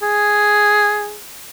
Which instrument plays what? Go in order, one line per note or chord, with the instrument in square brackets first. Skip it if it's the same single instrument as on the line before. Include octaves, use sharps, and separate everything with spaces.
[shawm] G#4